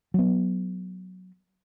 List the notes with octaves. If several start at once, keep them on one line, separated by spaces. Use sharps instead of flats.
F#3 B3